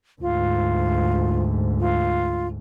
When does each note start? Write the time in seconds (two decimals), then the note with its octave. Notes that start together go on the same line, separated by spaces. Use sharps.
0.21 D2 G#2 F4
1.80 F4